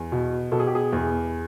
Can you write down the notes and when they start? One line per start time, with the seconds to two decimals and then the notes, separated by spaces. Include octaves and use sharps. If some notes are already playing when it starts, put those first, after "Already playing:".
Already playing: E2
0.12 B2
0.52 B2 A4
0.60 G#4
0.67 G4
0.75 G#4
0.93 E2